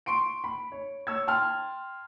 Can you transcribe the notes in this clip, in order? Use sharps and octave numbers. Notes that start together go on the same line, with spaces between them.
C6 C#6 D7
B5
C#5
C#5 E6 G#6
G5 A5 C6 F6